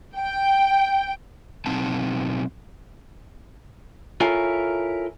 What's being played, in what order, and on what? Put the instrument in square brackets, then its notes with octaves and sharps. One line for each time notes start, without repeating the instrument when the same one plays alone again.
[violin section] G5
[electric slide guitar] B2 F#3 C4 D#4 A5
[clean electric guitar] E4 F4 A4 A#4 C#5 G#5